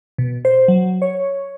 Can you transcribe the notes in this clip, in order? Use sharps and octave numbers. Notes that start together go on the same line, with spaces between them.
B2
C5
F#3
C#5